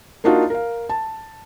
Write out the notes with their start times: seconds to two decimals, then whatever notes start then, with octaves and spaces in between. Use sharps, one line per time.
0.24 A#3 D4 D#4 F4 F#4
0.50 A#4 F5
0.90 A5